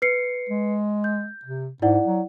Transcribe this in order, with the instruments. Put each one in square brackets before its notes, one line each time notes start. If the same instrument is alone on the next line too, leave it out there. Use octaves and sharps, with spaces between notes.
[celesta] B4 C7 C#7
[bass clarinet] G#3
[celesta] G6
[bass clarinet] C3
[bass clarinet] G#2 [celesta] E4 D5 F#5
[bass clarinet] F#3